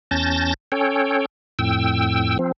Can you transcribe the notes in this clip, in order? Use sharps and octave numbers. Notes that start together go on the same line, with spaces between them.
E2 C#4 A5 G6 A6 A#6
C#4 A4 C#5 G5
F2 A2 G5 E6
F3 C4